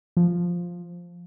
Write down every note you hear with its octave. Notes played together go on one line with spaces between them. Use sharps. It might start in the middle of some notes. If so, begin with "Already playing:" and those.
F3